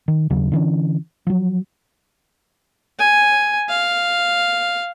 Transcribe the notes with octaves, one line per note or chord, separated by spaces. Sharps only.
D#3
D#2 C#3 F#3
D3 E3 C#4
F3 F#3
G#5
F5